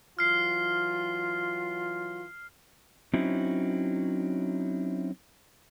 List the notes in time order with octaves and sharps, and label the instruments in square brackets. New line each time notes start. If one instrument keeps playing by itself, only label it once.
[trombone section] E3 F#3 F4 [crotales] F6 C7
[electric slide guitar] F#3 C4 C#4 D#4 E4